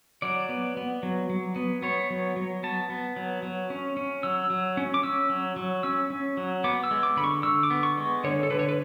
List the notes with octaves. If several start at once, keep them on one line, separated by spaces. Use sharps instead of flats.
F#3 D5
B3
B3
F#3
F#3
B3
B3 C#5
F#3
F#3
B3 A5
B3
F#3
F#3
C#4
C#4
F#3 E6
F#3
C#4
D6
C#4 E6
F#3
F#3
C#4 E6
C#4
F#3
B3 D6
E6
G#3
D6
D3 B5
C#6
D3 E6
D6
B3
C#6
G#3
D3 C#5
A4
D3 B4
C#5
B4